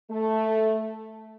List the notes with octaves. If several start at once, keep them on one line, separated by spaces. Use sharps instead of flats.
A3